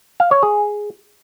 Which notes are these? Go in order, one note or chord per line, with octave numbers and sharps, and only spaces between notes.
F5
C#5
G#4